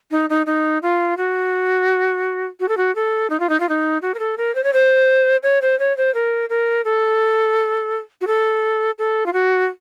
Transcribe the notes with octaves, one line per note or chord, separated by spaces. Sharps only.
D#4
D#4
D#4
F4
F#4
F#4
A4
F#4
A4
D#4
F4
D#4
F4
D#4
F#4
A#4
A4
A#4
C5
C#5
C5
C#5
C5
C#5
C5
A#4
A#4
A4
F#4
A4
A4
F4
F#4